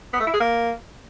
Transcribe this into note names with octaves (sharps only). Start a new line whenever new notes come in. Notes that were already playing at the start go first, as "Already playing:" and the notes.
B3
A3
E4
G#4
A#3